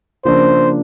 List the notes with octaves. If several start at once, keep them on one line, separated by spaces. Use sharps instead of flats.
C#3 F3 A#3 D4 C5